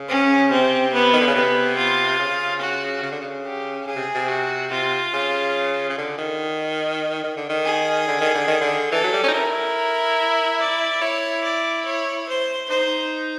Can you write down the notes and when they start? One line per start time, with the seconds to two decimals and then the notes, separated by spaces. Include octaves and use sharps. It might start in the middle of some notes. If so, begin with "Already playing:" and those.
Already playing: C#3
0.09 C#4
0.50 C3 C4
0.93 B3
1.13 D#3
1.20 D3
1.27 C#3
1.35 C3 B3
1.77 F4
2.19 C#3
2.61 F#4
3.03 C#3
3.12 D3
3.21 C#3
3.45 G4
3.87 C#3 G#4
3.96 C3
4.15 C3
4.29 F#4
4.71 C3 F4
5.13 C#3
5.89 C#3
5.97 D3
6.18 D#3
7.24 D#3
7.36 D3
7.49 D#3
7.65 G#4
8.08 D3
8.21 D#3
8.35 D3
8.47 D#3
8.61 D3
8.91 E3 A4
9.04 F#3
9.13 G3
9.23 C#4
9.28 D#4
9.33 E4 A#4
10.60 D5
11.01 E4 C#5
11.44 D5
11.85 C#5
12.28 C5
12.70 D#4 C5